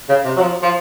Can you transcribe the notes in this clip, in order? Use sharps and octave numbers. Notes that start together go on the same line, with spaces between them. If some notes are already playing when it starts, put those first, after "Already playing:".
C#3
C3
F#3
F3
F3